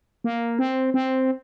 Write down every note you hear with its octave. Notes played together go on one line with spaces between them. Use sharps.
A#3
C4
C4